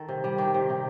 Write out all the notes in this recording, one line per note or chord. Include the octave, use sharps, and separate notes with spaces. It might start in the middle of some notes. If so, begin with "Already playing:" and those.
Already playing: D#3 A4
C3
G3
D#3 G4
C3
C3